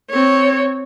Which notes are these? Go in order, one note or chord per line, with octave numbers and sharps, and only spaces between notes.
C4 C#5